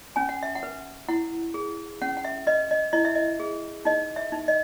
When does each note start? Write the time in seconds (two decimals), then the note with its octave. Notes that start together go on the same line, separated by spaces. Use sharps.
0.16 C#4 G#5
0.29 F#5
0.43 E5
0.55 F#5
0.63 B4
1.09 E4 F#5
1.54 G#4
2.02 C#4 F#5
2.17 F#5
2.25 E5
2.47 B4 D#5
2.71 D#5
2.93 E4 D#5
3.05 E5
3.15 D#5
3.40 G#4
3.85 D#4 D#5
4.16 E5
4.32 D#4
4.48 D#5